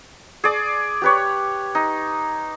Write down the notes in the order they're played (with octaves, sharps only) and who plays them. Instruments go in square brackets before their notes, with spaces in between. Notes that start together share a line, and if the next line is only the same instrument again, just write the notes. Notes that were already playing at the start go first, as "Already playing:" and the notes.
[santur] G#4 D5
G4 B4 C#5
D#4